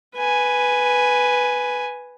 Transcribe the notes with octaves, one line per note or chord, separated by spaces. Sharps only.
B4 G#5